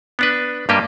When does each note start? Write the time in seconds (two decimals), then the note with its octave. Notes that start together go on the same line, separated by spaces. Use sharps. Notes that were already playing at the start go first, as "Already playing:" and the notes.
0.19 B3 D4 B4
0.69 G2 G3 A#3 G4 D#5